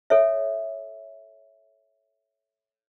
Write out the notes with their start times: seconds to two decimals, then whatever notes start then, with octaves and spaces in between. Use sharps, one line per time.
0.10 A4 C#5 E5